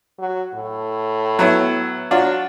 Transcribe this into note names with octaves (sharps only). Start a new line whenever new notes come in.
F#3
A2
F#3 B3 E4
F#3 D4 F4